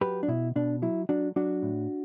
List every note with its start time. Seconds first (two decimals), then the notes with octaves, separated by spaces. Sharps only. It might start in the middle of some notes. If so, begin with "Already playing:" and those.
0.01 F#3 G4 B4
0.23 D4
0.28 B2 E4
0.56 B2 D4
0.82 F#3 E4
1.09 F#3 D4 F#4
1.36 F#3 D4 F#4
1.63 A2